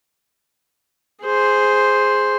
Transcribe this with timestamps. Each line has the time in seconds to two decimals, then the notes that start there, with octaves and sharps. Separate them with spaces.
1.24 G#4 C5